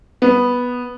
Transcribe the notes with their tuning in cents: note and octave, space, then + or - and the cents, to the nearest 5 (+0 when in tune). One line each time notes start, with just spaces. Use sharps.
B3 -5